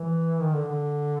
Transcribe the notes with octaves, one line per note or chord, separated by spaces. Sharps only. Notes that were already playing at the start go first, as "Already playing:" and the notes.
Already playing: E3
D#3
D3
D3